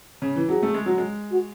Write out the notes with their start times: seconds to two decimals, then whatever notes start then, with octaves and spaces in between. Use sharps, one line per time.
0.22 C#3
0.36 E3
0.49 F#3 G#4
0.63 A3
0.74 G#3
0.86 F#3
0.98 G#3
1.30 F#4